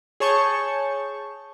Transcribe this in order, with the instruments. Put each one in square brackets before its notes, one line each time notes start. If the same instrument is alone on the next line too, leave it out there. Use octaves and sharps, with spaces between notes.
[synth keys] G#4 C#5 A5 C#6 G6